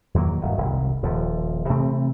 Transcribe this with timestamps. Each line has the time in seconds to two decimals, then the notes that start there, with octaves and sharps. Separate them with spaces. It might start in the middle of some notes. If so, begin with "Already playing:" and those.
0.14 E2 D#3 F#3 A#3
0.41 E1 G2 D#3
0.58 E1 C2 C3 D#3
1.02 D#1 D#2 F3
1.70 C3 E3 A3 C4